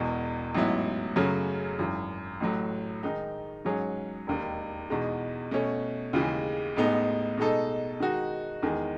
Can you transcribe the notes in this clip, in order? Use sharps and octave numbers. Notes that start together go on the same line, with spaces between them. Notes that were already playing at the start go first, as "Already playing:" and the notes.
Already playing: E1 E2 B2
A1 G#2 F#3 B3 E4
F#2 C#3 F#3 A3 C#4
G#1 F#2 E3
A1 A2 F#3
D#3 G#3 D#4
G#2 F#3 C#4 G#4
E1 D#2 D#3
E2 B2 G#3 D#4
B2 A3 C#4
D#2 C#3 E3 G#3
A1 A2 G#3 B3 D#4
B2 G#3 D#4 A4
D#3 G#3 D#4 F#4
E2 D#3 G#3